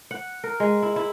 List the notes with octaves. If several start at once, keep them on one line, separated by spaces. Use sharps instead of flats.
F#5
A#4
G#3
E4
E4